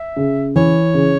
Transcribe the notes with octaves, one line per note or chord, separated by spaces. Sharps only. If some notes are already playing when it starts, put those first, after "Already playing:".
Already playing: E5
C#3
E3 C#5
C#3